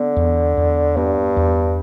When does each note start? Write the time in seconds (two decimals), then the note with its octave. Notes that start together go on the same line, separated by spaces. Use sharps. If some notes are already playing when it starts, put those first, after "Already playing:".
Already playing: D3 B3
0.16 E2
0.57 E2
0.97 G2 B3
1.37 E2